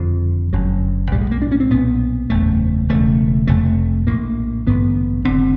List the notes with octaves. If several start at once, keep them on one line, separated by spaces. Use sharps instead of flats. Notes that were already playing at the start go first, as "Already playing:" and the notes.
Already playing: F#1 F2 D3 F3
F#1 F#2 D3 F#3
B1 A2 G3
G#3
A#3
D4
C#4
C4
B1 A#2 B3
F#1 E2 C#3 A3
E1 E2 C#3 A3
F1 F2 C3 A3
A#1 A2 A#3
A1 G2 D3 B3
F1 D#2 D3 C4